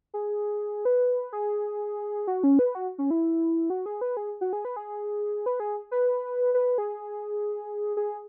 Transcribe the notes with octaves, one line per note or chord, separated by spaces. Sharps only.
G#4
B4
G#4
F#4
C#4
B4
F#4
C#4
E4
F#4
G#4
B4
G#4
F#4
G#4
B4
G#4
B4
G#4
B4
B4
G#4
G#4